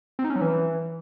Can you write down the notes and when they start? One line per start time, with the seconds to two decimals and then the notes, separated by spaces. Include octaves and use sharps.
0.19 C4
0.24 D#4
0.30 C#4
0.36 F#3
0.41 E3